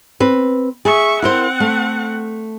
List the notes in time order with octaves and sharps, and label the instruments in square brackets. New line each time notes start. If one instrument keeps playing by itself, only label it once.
[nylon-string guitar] C4 B4
[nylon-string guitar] G#4 [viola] E5 C#6
[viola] C4 F#5 [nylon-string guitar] E4 A#4 C5
[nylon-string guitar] A3